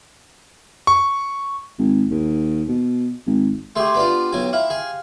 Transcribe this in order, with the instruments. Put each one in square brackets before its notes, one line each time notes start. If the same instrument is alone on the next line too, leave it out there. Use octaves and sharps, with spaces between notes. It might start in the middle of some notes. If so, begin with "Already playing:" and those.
[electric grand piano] C#6
[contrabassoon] G#1
D#2
B2
G#1
[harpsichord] A3 G#4 [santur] G4 C6
[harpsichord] B3 D4 F4
B1 F#3 G#5
[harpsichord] E4 [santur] F5
[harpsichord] G#4